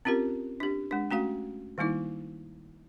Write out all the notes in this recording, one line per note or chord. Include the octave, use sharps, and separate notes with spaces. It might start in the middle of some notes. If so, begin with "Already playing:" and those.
C4 C#4 F4 G4 A#4
D4 G4
G#3 D4
A3 C#4 F#4 F5
D#3 G3 A#3 D#4 E4